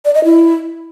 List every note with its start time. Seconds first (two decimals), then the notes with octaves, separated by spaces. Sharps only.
0.05 D5
0.15 D#5
0.24 E4